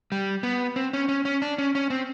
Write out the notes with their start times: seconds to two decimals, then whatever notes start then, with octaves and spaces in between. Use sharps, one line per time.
0.12 G3
0.43 B3
0.76 C4
0.93 C#4
1.09 C#4
1.25 C#4
1.42 D4
1.58 C#4
1.75 C#4
1.90 C4